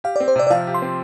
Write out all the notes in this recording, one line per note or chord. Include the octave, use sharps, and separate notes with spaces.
G4 F5
C4 D5
C5
C3 D5
D5
F3 F5
G4
C6
C4